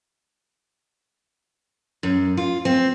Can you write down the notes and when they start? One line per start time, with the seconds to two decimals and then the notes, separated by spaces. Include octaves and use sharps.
2.03 F#2
2.37 F4
2.65 C4